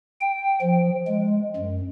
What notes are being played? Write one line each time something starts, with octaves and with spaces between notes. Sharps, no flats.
G5
F3
G#3
F#2